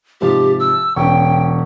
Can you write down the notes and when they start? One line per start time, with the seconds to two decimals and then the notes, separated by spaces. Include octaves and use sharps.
0.21 G#2 C3 F3 G4
0.60 E6
0.96 E1 C#4 G5 C#6